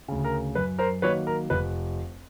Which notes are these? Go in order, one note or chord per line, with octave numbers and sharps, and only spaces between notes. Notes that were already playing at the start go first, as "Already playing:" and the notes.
D2 C#3
A#4
F#2 B4
A#4 C5
D#3 F#3 A#3 B4 C#5
A#4
F1 B4